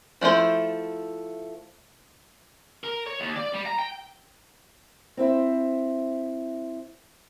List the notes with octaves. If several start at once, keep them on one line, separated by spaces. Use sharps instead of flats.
F3 A3 E4 C5
A#4
C#5
D#2
D5
G3
A#5
G5
C4 E4 C5 E5